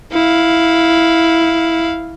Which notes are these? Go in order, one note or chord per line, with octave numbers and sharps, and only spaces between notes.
E4 F5